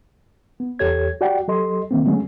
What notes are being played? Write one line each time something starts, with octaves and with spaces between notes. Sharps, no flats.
B3
E2 G4 A4 C#5 G#6
F#4 G4 D5 F#5 G5
F#3 G4 A4 D#5 C6
D#3 A#3 C4
D3 F#3 G#3 A3 B3 C#4